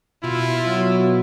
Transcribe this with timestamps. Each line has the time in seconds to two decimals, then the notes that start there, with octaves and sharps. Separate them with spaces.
0.23 B2 E4 F4
0.66 F#3